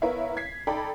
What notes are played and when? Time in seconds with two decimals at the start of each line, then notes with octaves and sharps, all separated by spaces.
0.02 B3 E4 A#4 C#5 E5 F5
0.37 G#6 B6 C7
0.67 D#4 A4 D5 G5 A#5 B5